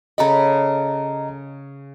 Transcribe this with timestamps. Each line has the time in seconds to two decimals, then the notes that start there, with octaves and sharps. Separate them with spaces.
0.18 C#3 A4 D#5 A#5 B5